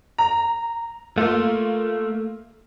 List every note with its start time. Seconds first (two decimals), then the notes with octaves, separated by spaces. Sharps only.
0.18 A#5
1.18 A3 A#3 F4